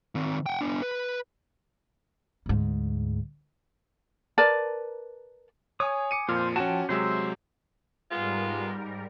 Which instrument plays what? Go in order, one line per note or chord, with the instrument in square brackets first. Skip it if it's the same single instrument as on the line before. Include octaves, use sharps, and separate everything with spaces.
[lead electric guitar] D#3 C4
F#5 G5
B3 D4
B4
[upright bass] D2 G#2
[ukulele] A#4 B4 D5 A5
[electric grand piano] C#5 [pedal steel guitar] G#5 D#6
[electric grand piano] D6 C#7 D#7
[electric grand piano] F2 A#2 F3 [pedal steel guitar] C5 F6
[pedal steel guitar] F3 G5 A5 [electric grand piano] C#4 F#4
[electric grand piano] C3 F#3 G#3 [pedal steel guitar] C5 E5
[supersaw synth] G#2 G3 A#4 [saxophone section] G#3 B3 F4